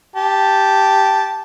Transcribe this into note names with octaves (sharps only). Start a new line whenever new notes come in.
G4 A5